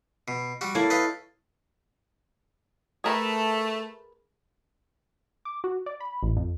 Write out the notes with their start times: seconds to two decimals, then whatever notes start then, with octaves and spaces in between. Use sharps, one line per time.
0.28 B2
0.61 G3 F#4
0.75 A#3 E4 A4 C#5
0.90 B4 D#5 F5
3.04 A3 G#4 A#4 B4
5.45 D6
5.64 F#4
5.86 D5
6.01 B5
6.23 A1
6.37 F2